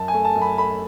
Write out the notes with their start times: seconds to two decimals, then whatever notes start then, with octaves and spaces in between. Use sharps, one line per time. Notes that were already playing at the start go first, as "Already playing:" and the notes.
Already playing: F#2 A5
0.08 G#5
0.14 A3
0.25 A5
0.35 F#2
0.42 B5
0.58 A3 B5